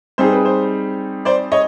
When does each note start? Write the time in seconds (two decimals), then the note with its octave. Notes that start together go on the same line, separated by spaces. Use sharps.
0.18 G3 C4 D#4 G#4 C5
0.32 B4
0.45 C5
1.25 C5 D5
1.52 C#5 D#5